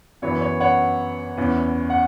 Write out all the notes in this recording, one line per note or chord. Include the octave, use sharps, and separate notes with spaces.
F#2 E3 B3 C#5
C#5
C#5 F#5
E2 E3 C#4
F#5